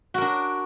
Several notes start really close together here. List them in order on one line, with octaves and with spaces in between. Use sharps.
F#4 A#4 D4